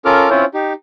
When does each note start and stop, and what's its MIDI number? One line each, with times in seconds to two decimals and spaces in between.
0.05 0.30 61
0.05 0.30 65
0.05 0.30 69
0.05 0.30 70
0.05 0.30 86
0.05 0.30 89
0.30 0.45 60
0.30 0.45 61
0.30 0.45 64
0.30 0.45 65
0.30 0.45 72
0.30 0.45 73
0.54 0.73 63
0.54 0.73 67